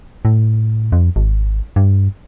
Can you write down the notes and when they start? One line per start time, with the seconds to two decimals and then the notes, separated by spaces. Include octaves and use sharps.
0.25 A2
0.92 F2
1.16 G#1
1.76 G2